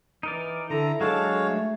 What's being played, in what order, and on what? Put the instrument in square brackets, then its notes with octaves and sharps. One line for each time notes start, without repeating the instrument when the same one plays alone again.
[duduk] E3 [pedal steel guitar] D#4 A#4 D5
[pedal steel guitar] D3 [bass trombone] E4 [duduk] A4 [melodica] A#5
[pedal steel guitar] F#3 D4 A5 [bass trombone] G#3 [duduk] A4 [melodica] C#5 F5
[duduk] A3